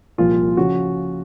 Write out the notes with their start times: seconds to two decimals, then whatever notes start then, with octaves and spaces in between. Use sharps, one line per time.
0.18 C2 A#2 F3 F4
0.57 C#3 F3 F#4